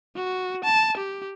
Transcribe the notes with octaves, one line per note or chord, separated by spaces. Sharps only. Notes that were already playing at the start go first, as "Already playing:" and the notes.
F#4
A5
G4